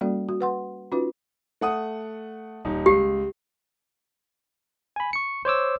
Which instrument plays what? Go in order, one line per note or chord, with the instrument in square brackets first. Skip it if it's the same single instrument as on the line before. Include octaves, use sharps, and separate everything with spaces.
[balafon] G3 A#3 C#4 F#4 A4 D5
F#4
B4 F#5 C6
C#4 D#4 F4 F#4 B4
[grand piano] A3 F#5 D#6
D#1 D#4
[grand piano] C#2 C7 [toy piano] G4
[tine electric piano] G#5 B5
C#6 C#7
C5 C#5 D6 E6